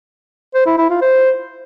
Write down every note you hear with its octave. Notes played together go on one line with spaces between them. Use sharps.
C5
E4
E4
F4
C5